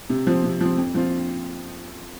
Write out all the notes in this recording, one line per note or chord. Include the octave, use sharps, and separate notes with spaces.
C3
F3 C4
C3
F3 C4
F2
F3 C4 F4